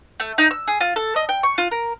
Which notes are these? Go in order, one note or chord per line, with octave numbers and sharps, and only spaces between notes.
A3
D#4
E6
G#4
F4
A4
D#5
G5
C#6
F4
A#4